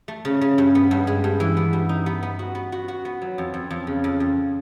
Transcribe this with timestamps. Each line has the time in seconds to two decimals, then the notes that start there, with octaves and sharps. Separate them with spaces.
0.08 A3
0.25 C#3
0.41 C#3
0.58 G2
0.75 B3
0.91 G2
1.07 G#3
1.24 G2
1.40 E3
1.57 B3
1.73 G2
1.89 D#4
2.06 B3
2.23 B3
2.39 F#4
2.55 B3
2.72 F#4
2.88 F#4
3.05 B3
3.22 F#3
3.38 F2
3.54 F2
3.70 F2
3.87 C#3
4.04 F2
4.20 F2